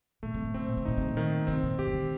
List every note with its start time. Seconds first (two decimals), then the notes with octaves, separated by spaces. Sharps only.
0.23 A#2 A3
0.34 C3
0.44 A#2
0.54 C3 C4
0.66 A#2
0.77 C3
0.85 A#2 D#4
0.98 C3
1.08 A#2
1.17 D#3
1.47 C3 C4
1.63 A#2
1.79 C3 G4
1.87 D#3
1.93 D3